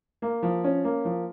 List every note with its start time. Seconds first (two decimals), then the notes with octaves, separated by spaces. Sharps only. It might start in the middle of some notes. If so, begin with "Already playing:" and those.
0.22 A#3
0.43 F3
0.64 C#4
0.84 A#3
1.05 F3